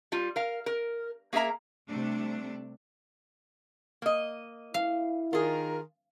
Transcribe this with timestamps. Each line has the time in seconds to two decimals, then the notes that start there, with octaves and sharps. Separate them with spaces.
0.12 G3 F4
0.36 A#4 F5
0.66 A#4
1.33 A#3 G#4 A#4 E5 A#5
1.88 C3 G3 A3 D4
4.02 A#3 D#5
4.74 E4 F5
5.33 D#3 F4 G#4 A#4